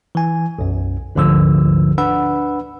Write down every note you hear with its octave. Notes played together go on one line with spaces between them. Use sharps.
E3 G#5
B1 F#2
G1 D2 G#2 D3 F3 E6
D4 B4 F#5 B5 E6